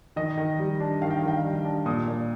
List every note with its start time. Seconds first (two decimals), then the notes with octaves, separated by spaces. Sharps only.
0.16 D#3 D#5
0.37 D#3
0.59 G3
0.80 D4
1.02 D#3 F5
1.11 G5
1.19 D#3 F5
1.28 G5
1.37 F5
1.44 G3
1.65 D4
1.86 A#2 D#6
2.08 A#2